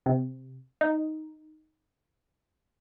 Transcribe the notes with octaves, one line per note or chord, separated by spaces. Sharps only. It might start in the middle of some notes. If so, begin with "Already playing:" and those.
C3
D#4